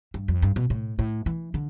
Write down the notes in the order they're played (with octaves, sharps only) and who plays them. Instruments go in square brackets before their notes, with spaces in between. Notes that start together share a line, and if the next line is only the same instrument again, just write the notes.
[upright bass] G2
F2
G2
B2
A2
A2
E3
D3